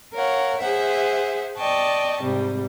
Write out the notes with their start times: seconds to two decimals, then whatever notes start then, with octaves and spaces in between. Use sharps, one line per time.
0.14 A#4 C#5 F5 F#5
0.59 G#4 C5 E5 F#5
1.57 D5 D#5 G5 A5 C#6
2.22 G#2 C3 G3